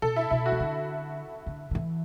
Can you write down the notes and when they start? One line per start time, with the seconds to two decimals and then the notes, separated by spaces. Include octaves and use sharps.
0.02 B2 A4
0.16 E4
0.30 B2 E4
0.46 F#4
0.52 E3
0.60 D3
1.46 D3
1.71 D3
1.75 E3